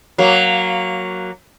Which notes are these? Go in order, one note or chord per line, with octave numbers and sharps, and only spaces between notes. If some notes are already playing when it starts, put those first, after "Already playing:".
F#3 A#3